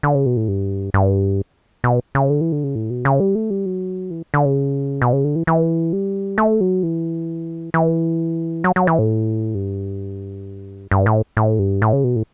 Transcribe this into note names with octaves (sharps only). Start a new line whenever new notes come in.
D3
C#3
B2
A2
G2
G2
B2
C#3
D3
E3
D3
C#3
A2
B2
C#3
G3
A3
G3
F#3
E3
D3
C#3
B2
C#3
D3
E3
E3
G3
A3
F#3
E3
E3
F#3
F#3
E3
A2
G2
G2
A2
A2
G2
A2
C#3
B2
A2